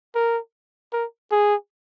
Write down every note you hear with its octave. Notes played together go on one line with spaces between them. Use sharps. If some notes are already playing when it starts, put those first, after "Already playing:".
A#4
A#4
G#4